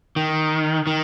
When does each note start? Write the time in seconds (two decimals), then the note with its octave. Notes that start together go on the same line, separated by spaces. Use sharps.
0.16 D#3
0.87 D#3